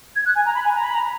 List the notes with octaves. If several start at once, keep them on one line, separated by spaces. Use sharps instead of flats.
G#6
F#6
G#5
A#5
B5
G#5
A#5
B5
A#5